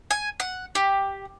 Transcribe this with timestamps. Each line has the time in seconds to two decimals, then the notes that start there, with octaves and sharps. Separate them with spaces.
0.11 G#5
0.40 F#5
0.75 G4